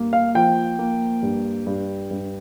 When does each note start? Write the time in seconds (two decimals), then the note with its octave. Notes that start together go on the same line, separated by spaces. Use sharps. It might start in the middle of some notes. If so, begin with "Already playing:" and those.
Already playing: G2 A#3
0.13 F5
0.35 F3 G5
0.79 A#3
1.22 G2
1.67 G2
2.11 G2